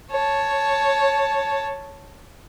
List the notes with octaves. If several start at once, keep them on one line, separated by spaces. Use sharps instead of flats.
C#5 A5